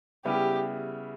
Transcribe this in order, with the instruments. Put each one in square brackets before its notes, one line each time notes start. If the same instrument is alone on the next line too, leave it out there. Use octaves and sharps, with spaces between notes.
[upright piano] C#3 G3 B3 E4 [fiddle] G4